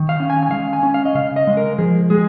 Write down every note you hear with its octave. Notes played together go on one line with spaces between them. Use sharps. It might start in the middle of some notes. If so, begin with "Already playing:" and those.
Already playing: D#3
F5
C#4
G#5
G#5
G#3 F5
G#5
C#4
F5
D#5
C#3 F5
D#5
G#3
A#4
F3 G#4
G#3 G#4